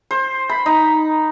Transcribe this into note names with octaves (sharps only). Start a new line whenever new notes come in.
C5
B5
D#4